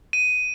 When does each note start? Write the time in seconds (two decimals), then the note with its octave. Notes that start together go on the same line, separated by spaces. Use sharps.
0.13 D#7